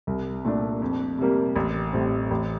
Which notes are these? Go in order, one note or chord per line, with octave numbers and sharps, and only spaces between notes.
C2
A#2 A3 D4
F2
C3 G3 A#3
A1
A2 G3 C4
A1